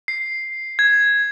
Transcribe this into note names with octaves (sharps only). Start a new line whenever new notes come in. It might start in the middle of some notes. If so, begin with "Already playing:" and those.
C7
G#6